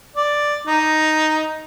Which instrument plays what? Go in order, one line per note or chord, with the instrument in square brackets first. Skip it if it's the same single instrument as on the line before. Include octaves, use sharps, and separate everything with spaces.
[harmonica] D5
D#4